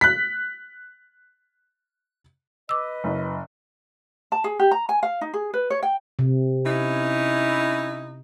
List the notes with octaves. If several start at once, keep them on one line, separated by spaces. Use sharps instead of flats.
F#6 B6
B4 D#5 D6 E6
F#1
A5
G#4
G4
A#5
G#5
F5
D#4
G#4
B4
C#5
G5
C3
C#4 D#4 E4